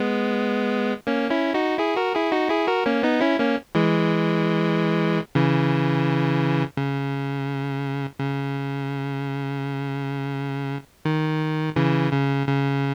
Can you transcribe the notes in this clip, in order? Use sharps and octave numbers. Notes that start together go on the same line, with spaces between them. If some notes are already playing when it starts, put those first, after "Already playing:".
Already playing: G#3 B3
A#3 C#4
C#4 E4
D#4 F#4
E4 G#4
F#4 A#4
E4 G#4
D#4 F#4
E4 G#4
F#4 A#4
A#3 C#4
B3 D#4
C#4 E4
A#3 C#4
E3 G#3
C#3 E3
C#3
C#3
D#3
C#3 E3
C#3
C#3